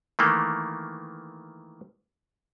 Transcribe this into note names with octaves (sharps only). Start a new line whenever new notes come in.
D#3 E3 A3 A#3